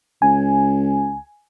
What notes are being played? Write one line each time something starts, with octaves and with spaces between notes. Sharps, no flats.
C#2 G#5